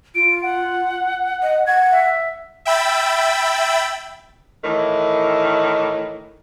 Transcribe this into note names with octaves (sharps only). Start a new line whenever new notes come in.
F4 D7
F#5
D#5
F#5 G#6
E5
E5 G5 B5 E6 A6
A2 D#3 E3